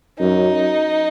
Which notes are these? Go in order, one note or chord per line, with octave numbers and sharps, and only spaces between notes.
F#2 D#4